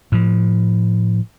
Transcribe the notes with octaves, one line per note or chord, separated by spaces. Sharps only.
A2 F3